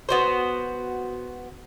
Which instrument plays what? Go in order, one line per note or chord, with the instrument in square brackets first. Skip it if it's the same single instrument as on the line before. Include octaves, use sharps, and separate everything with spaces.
[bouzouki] B3 F#4 C5